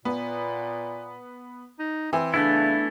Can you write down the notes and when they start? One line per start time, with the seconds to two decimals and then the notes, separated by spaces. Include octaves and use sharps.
0.05 A#2 B3
1.79 D#4
2.13 E3 C4
2.34 C#3 A3 B3 D4 E4